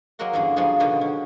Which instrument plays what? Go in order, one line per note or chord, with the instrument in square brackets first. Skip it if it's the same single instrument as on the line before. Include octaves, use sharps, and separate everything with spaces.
[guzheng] F#3 G#3 A#3 F#4 A#4 F#5
E2 G2 D3 C#4 G#4
C#3 F3 F#3 G#3 G#4
B2 D3 D#3 C#4 D4
C#4